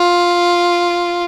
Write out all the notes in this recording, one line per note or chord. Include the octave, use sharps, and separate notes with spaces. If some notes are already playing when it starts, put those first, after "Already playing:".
Already playing: F4